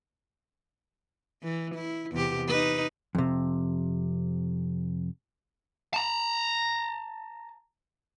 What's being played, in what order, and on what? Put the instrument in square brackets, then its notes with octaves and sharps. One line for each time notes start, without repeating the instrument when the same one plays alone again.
[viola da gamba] E3
E4
E2 C3 G4
D#4 B4
[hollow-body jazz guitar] F2 C3
[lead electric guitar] A5 A#5